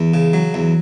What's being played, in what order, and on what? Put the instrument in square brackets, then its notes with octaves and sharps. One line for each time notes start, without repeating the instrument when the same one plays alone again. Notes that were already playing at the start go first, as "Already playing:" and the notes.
Already playing: [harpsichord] E2
C#3
F#3
E2